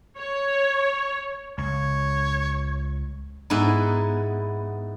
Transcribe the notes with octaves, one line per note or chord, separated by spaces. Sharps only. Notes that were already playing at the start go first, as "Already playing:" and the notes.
C#5
C#2 C#5
G#2 B3 D#4 E4